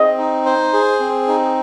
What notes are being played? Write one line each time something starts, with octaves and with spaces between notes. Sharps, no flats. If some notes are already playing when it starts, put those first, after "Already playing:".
Already playing: C4 D#5
D#4
C5
G#4
C4
D#4